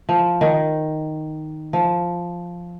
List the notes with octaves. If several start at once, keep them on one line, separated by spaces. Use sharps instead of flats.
F3
D#3
F3